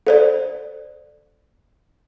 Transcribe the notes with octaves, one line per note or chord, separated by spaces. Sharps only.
A4 C5 D5